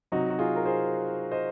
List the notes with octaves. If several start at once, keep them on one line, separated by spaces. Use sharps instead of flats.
C3 F#3 D#4 F#4
F#4
F4 G#4
A#4
G#4 C5
C5 D#5